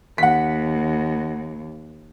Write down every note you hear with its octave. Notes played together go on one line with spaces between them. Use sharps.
D#2 F#5 B6